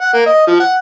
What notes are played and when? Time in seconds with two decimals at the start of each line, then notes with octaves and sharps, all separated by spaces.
0.01 F#5
0.14 A#3
0.26 D#5
0.47 F3
0.60 F#5